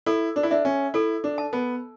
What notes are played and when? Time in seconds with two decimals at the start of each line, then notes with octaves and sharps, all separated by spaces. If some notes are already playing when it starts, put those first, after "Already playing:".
0.06 E4 A4
0.36 D4
0.43 E4
0.51 D4 E5
0.65 C#4
0.94 E4 A4
1.24 D4
1.38 A5
1.53 B3